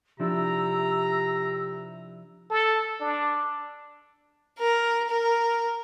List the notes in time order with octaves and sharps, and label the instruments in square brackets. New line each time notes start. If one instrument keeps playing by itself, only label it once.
[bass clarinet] C3 [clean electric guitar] F3 D4 E4 [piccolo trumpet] A#5 [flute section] E6
[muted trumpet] A4
D4
[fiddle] A#4
A#4